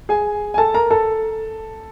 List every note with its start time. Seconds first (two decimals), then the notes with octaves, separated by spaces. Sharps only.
0.09 G#4 G#5
0.54 G#5
0.58 A4 A5
0.74 A#4 A#5
0.90 A4 A5